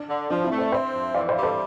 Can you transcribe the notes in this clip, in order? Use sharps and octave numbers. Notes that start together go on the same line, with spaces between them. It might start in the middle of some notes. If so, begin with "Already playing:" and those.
Already playing: D4
D3
F3 D4
C4 E4
A3
A4 C5
C4 C5 E5
F2
E3 D5 F5
C5 E5
G3
A4 C5